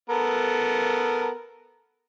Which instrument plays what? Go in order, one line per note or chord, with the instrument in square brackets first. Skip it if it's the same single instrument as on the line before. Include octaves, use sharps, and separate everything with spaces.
[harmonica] B3 A4 A#4